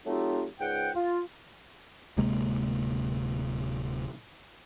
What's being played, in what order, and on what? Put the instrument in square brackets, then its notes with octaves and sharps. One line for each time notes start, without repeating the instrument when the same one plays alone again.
[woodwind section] F#3 A3 C4 D#4 F4 G4
C#2 G#2 F#5 G5
F4
[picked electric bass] D1 C3 G#3 A#3